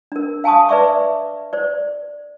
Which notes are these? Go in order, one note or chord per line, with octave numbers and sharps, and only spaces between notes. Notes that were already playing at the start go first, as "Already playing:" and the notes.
D4 A#4
F5 G#5 A5 C#6 D#6
B4 D5 E5 C#6 D6
C5 D5